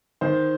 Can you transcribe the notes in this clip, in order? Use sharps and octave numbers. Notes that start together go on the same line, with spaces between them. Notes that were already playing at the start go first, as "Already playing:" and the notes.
D#3 C5